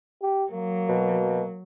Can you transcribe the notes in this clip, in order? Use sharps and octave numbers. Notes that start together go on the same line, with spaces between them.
G4
F#3 A#3
B2